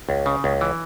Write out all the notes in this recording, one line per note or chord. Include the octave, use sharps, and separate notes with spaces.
C#2
C#3
C#2
E3